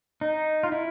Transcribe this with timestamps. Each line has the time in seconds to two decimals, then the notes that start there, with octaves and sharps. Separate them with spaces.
0.21 D#4
0.63 F4
0.72 E4